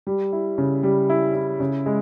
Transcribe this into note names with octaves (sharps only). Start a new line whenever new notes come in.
G3
E4
C#3
G3
E4
E4
C#3
G#3